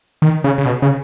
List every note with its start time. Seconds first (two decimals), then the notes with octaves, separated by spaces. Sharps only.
0.22 D#3
0.44 C#3
0.58 C#3
0.65 B2
0.82 C#3